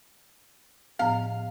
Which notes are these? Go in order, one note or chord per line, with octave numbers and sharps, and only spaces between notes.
A2 F3 B3 F5